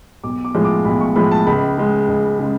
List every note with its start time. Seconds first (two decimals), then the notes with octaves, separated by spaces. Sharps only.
0.24 B1 D6
0.45 D6
0.54 A2 F3 G#3
0.65 D6
0.85 B1 B5
1.01 C#6
1.16 A2 F3 G#3 B5
1.31 A5
1.47 C#2 B5
1.77 C#3 G#3
2.08 C#2
2.39 C#3 G#3